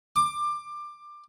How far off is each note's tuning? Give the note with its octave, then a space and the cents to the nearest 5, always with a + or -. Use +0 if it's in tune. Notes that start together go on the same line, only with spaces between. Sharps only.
D6 +20